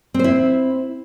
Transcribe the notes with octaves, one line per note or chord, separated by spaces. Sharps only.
C4 E4 C5